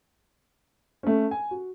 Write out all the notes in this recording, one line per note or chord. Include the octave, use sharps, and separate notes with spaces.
A3 C#4
G#5
F#4